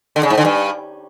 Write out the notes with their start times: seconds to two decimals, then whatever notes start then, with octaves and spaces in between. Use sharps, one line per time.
0.16 D3
0.23 C#3
0.30 G#2
0.37 D3
0.45 G2